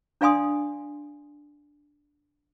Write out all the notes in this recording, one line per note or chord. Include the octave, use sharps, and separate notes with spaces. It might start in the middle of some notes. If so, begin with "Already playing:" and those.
D4 D5 F5 G#5 C6 D#6